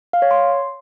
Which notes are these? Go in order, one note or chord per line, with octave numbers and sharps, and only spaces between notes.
F5
C#5
C6